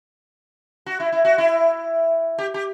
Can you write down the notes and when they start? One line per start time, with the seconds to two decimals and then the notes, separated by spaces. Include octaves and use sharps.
0.86 F#4
1.00 E4
1.12 E4
1.25 F#4
1.38 E4
2.38 G4
2.54 G4